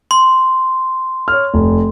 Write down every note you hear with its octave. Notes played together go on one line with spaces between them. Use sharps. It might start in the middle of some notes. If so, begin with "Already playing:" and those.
C6
C#5 F6
F1